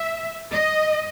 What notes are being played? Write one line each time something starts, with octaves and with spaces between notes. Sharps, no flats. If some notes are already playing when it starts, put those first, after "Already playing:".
Already playing: E5
D#5